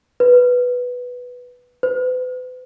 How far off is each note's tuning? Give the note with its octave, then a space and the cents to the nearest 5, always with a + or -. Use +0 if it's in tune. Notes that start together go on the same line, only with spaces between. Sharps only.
B4 +0
B4 +40